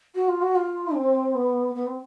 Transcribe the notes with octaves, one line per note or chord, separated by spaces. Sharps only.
F#4
F4
F#4
F4
C4
B3
B3
C4